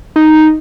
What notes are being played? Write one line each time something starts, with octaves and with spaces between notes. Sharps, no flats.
D#4